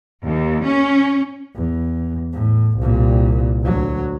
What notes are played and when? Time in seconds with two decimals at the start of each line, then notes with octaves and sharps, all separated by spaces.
0.24 D#2
0.65 C#4
1.55 E2
2.33 A2
2.78 C2 A#2
3.63 D2 F#3